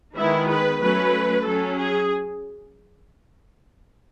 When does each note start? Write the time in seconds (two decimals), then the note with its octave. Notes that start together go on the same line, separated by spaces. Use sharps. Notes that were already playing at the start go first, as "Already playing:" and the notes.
0.16 D#3 G#3 B3 E4
0.48 B4
0.80 F#3 A3 C#4 B4
1.44 F#3 C#4 A4
1.77 G#4